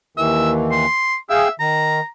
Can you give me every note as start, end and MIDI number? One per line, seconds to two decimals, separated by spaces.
0.17 0.86 39
0.17 0.86 51
0.17 0.86 52
0.17 0.51 76
0.71 1.16 84
1.30 1.48 68
1.30 1.51 76
1.30 1.48 77
1.30 1.48 79
1.60 2.00 51
1.60 2.07 82